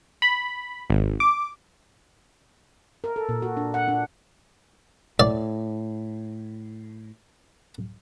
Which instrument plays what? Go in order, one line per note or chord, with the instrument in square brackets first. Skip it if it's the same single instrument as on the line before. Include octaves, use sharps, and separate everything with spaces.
[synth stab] B5
G#1
D6
[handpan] A#4
A4
A#2
F#4
D4
F#5
D4
[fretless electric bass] A2 [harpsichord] D5